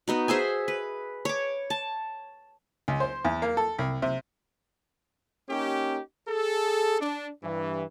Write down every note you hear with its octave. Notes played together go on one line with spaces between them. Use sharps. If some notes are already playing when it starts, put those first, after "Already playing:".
B3 D#4 F#4
G#4 C5 E5 G#5
B4
C#5 D6
A5
C#2
C5
E2
A#3
A4
C2
C3
A#3 C#4 D#4 G4
G#4 A4
D4
G2 E3